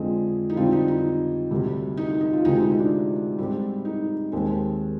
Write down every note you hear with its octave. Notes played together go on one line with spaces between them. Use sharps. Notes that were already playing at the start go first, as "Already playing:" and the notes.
Already playing: F2 D3 F3 G#3 C4 D#5
D#4
F2 D3 G3 C4 F4
D#4
D#4
D2 C3 G3
D#4
D#4
D#4
F4
D2 C3 F3 G#3 C4 D#4
D#4
D#4
D4
G#2 G3 C4
D#4
D#2 D#3 G#3 C4